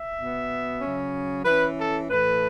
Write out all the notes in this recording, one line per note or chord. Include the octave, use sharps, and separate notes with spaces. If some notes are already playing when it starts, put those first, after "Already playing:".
Already playing: E5
B2
B3
C#3 F#3 C#4
E3 C#4 B4
A4
A2 E3 A3 B4